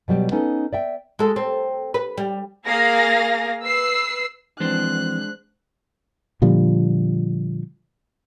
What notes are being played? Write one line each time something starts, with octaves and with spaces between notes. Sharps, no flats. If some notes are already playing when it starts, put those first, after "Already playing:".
B2 F#3 G3 G4
B3 C#4 D#4 A4
D5 E5 G5
G#3 A4
C4
B4
G3
A#3 G#4 F5 A#6
B4 E6 C7
E3 F3 G#3 C4 D4 C5 F#6
A#2 D3 F3 G3